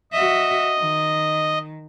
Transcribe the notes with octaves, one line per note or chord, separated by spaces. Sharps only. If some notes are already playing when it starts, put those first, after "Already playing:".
F#4 D#5 E5
D#3